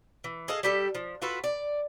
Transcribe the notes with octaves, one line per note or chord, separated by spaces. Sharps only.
E3
G#4 A4 D#5 F5
G3 G4 A4
F3
F4 F#4 A4 B4
D5